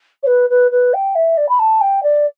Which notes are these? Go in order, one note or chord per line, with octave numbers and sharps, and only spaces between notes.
C#5
B4
B4
B4
G5
E5
D5
B5
A5
G5
D5